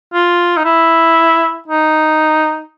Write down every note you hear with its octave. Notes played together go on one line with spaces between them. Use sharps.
F4
D#4
E4
D#4